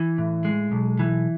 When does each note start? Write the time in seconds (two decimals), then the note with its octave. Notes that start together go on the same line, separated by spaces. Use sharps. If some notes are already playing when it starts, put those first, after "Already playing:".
Already playing: E3
0.18 A2
0.45 G#3
0.72 B1
0.99 E3